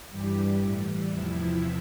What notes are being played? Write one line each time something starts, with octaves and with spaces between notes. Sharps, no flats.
G2 E3 G3 G4
A2 E3 G3
E2 C3 F3 E4